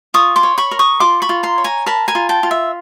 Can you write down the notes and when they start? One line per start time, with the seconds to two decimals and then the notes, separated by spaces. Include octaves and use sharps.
0.14 F4 C#6 D#6
0.36 C6 D6
0.43 C#5
0.58 B5 C#6
0.71 A#4
0.79 C#6 D#6
1.00 F4 C6 D6
1.22 B5 C#6
1.29 F4
1.43 A#5 C6
1.58 C#5
1.64 G#5 A#5
1.86 A#4 A5 B5
2.08 G#5 A#5
2.15 F4
2.29 G5 A5
2.43 F4
2.51 E5